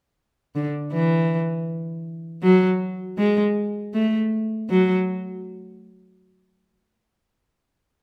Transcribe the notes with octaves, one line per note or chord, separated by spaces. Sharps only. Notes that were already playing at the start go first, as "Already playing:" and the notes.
D3
E3
F#3
G#3
A3
F#3